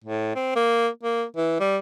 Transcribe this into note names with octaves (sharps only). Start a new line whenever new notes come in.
A2
C4
A#3
A#3
E3
G3